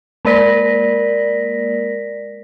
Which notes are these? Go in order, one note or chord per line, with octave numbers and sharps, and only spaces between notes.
G#3 A#3 A#4 D5 A#6 B6